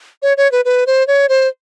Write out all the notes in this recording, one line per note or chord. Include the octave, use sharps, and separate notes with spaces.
C#5
C#5
B4
B4
C5
C#5
C5